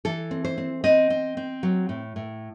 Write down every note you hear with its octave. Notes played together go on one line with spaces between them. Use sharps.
E3 A4
C4
C5
C4
C4 D#5
C4
C4
F#3
A2
A2